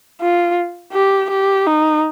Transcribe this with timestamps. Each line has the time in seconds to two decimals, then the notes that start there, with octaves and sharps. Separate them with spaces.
0.21 F4
0.93 G4
1.31 G4
1.67 D#4